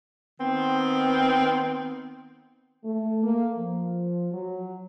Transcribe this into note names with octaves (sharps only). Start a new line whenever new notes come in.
D#3 B3 C4
A3
A#3
F3
F#3